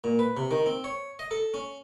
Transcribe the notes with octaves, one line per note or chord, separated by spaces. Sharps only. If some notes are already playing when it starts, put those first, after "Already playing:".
A#2
B4
C3
D#3
C4
C#5
D#5
A4
C#4